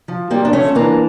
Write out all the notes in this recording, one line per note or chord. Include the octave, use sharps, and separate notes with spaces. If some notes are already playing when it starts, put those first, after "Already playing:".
F3
F3 G3 A#3
D4
F3 A3 C#4
E3 A#3 D4